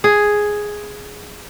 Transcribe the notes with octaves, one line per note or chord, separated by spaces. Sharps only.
G#4